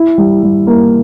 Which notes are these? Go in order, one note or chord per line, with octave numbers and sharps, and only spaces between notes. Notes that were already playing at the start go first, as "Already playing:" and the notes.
Already playing: E4
G3
G3
A#3